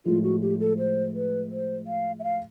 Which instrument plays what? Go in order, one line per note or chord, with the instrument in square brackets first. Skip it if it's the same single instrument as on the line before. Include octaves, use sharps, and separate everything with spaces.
[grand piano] A2 F3 G#3 [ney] F4
[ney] F#4
G4
A4
C5
B4
C5
F5
E5
F5